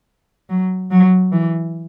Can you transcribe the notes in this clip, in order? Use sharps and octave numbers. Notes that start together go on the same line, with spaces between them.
F#3
F#3
E3